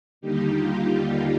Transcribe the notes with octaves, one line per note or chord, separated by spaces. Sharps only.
D#2 D3 G3 A#3 D#4 G4
F4
D#4 G4